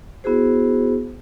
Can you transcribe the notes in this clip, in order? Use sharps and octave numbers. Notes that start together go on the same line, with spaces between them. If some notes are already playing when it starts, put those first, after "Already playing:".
B3 E4 F#4 G#4 C5